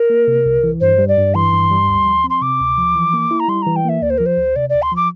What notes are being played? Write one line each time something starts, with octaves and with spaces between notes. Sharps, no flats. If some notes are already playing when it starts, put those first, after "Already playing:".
Already playing: A#4
A#3
C3
C2
E3
G2 C5
G3
D5
G2
E3 C6
G2
G3
D2
F3
C4
C6
C3 D6
D2
F3
E3
A#3
E4
A#5
G3 C6
E3 A#5
G5
A#3 E5
D2 D5
C5
F3 A#4
C5
D2
C3 D5
D2 D5
C6
F3 D6